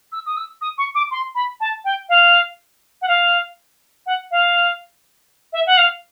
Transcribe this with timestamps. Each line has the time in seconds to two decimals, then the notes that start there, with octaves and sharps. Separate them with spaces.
0.12 E6
0.26 D#6
0.37 E6
0.61 D#6
0.78 C#6
0.95 D6
1.11 C6
1.35 B5
1.60 A5
1.85 G5
2.09 F5
3.02 F#5
3.08 F5
4.06 F#5
4.31 F5
5.53 E5
5.66 F#5
5.77 F5